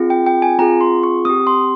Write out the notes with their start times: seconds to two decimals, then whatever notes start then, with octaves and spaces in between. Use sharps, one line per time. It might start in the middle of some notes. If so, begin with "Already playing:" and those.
Already playing: C4 F4 G#4
0.10 G5
0.26 G5
0.42 G#5
0.59 C4 F4 G#4 A#5
0.81 C6
1.03 C#6
1.25 C4 G4 D#6
1.47 C6